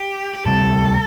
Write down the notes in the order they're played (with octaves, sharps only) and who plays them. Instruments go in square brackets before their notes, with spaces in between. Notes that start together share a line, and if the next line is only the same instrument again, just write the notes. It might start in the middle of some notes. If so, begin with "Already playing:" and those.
Already playing: [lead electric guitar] G4
G4
[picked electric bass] D2 C3 G3 C4 [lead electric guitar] A4